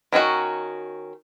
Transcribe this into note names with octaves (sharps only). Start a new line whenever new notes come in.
D#3 C#4 D#4 F#4